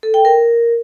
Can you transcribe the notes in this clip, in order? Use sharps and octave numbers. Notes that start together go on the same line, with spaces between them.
A4
G5
A#4